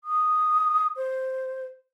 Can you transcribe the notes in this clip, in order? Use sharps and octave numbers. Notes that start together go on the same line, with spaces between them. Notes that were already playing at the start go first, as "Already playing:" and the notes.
D#6
C5